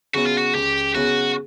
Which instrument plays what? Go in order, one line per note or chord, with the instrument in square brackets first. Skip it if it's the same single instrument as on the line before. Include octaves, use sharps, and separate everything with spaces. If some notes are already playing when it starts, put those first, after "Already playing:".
[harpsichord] C#3 F#3 B3 E4 [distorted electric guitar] F#4
[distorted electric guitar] F4
F#4
[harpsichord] C#2 [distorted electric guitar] G4
[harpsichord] C#3 F#3 B3 E4 [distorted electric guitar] F#4